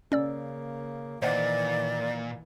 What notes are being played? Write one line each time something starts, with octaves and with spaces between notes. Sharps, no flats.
C#3 A#3 C#4 D5 E6
A#2 D#3 E3 C5 D5 D#5 F#5